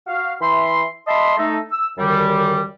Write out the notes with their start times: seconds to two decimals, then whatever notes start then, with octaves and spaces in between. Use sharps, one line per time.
0.07 F#4 F5
0.41 E3 E5 B5 C6
1.07 D#5 E5 A5 B5 C6
1.37 A3 D#4 A4
1.71 E6
1.98 F#2 D3 D#3 G3